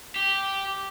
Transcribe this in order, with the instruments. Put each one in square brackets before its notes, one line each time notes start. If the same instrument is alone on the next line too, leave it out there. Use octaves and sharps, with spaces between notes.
[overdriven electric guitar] G4